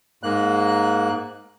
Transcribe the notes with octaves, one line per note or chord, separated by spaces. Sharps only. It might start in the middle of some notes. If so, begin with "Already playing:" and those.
G#2 A#3 F#6